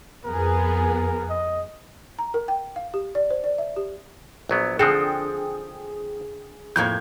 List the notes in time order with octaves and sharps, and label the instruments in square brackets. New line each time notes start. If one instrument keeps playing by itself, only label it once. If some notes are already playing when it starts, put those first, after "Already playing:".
[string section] F2 B3 G#4 [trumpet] A#4
[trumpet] D#5
[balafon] A#5
A#4
G5
F5
G4
D5
C5
D5
E5
G4
[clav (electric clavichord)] A#1 F#3 B3
[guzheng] D3 [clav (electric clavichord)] F3 C4 A4 [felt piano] G#4 [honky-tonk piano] G5 D#6
[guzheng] F2 A2 A#3 [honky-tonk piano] G6 G#6